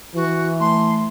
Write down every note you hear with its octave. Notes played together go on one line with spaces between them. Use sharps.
E3 F#4
A3 C6